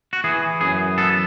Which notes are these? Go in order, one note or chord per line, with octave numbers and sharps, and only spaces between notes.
F#4
E3 G#4
F#2 G#4
B3 A4